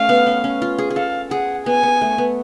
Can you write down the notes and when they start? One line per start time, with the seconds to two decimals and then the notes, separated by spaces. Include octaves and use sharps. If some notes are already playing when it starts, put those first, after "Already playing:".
Already playing: A3 C#4 F5
0.09 B3
0.27 C#4
0.44 C#4
0.62 F4
0.78 G#4
0.90 G#4
0.96 A4 F5
1.31 G#4 F#5
1.66 B3 G#5
1.83 B3
2.01 A3
2.18 B3